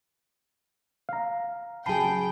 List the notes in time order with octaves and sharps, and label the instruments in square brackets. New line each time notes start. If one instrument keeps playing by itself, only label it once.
[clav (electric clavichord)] F5 A#5
[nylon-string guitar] C#3 F#3 G#4 [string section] G5 [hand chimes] A5 B5 C7